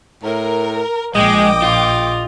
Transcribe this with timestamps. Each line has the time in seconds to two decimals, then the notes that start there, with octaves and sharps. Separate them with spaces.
0.23 A2 A#4
1.15 A#1 G#3 D#5 G5 D6
1.62 F4